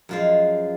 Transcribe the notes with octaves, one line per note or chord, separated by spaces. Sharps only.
F#2 F3 G#3 F4 F5